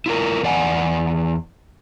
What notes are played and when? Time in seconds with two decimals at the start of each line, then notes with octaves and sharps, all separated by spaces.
0.06 E4 F4 A#4
0.43 E2 D5 F#5 G#5